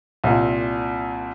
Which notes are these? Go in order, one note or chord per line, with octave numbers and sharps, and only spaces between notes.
C2 A#2